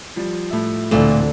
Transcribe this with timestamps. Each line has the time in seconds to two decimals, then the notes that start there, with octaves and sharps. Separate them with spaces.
0.16 F3 G3
0.50 A2 E5
0.91 D2 A#2 D3 E3 A3 C4 A4